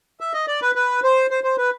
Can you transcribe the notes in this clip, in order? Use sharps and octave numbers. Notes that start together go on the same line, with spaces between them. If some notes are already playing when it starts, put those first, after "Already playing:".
E5
D#5
D5
B4
B4
C5
C5
C5
B4